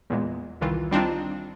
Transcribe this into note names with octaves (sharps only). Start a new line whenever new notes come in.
E2 A#2 G#3
C2 D#3 E3 F4
G3 C4 D4 D#4 F4